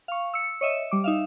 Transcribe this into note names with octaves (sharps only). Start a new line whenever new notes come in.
F5 C#6
E6 C#7
C#5 D#5 E5
G3 D6
D#4 E5 F5